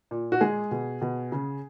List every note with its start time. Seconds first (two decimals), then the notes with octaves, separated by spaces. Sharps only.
0.11 A#2
0.32 F#4
0.41 G#3 G#4
0.71 B2
1.02 B2
1.32 C#3